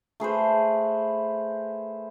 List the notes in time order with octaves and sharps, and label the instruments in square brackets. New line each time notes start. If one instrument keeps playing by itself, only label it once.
[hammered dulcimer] A3 G#4 B4 C5